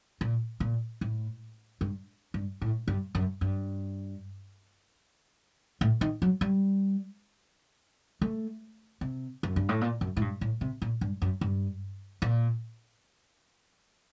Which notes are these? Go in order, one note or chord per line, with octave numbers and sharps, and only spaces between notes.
A#2
A#2
A2
G2
G2
A2
G2
F#2
G2
A2
D#3
F#3
G3
A3
C3
F#2
G2
A2
A#2
F#2
A2
G2
A2
C3
A#2
G2
F#2
G2
A#2